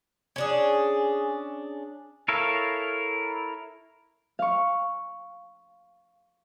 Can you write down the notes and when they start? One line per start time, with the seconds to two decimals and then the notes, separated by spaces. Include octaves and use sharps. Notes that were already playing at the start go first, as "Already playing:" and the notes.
0.36 C#4 D4 G#4
2.28 E4 A4 A#4 C#5 F5
4.39 F5 C#6